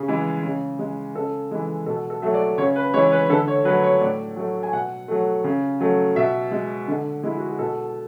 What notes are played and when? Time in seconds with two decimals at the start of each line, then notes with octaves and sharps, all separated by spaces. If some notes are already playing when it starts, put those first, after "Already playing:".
Already playing: C#3 G#4
0.08 E3 G#3
0.43 C#3
0.79 G#3
1.15 C#3 A4
1.51 E3 G#3
1.86 B2 A4
2.10 A4
2.22 F#3 A3 E5
2.34 D5
2.58 C#3 C#5
2.76 B4
2.94 E3 G#3 C#5
3.12 B4
3.30 D3 A4
3.48 C#5
3.65 F#3 B4
3.69 A3
3.83 C#5
4.01 A2 D5
4.36 F#3 A3
4.63 G#5
4.73 B2 F#5
5.08 F#3 A3
5.44 C#3
5.80 F#3 A3
6.16 B2 E5
6.51 G#3
6.88 D3
7.23 G#3 E4
7.37 F#4
7.48 G#4
7.59 B2 A4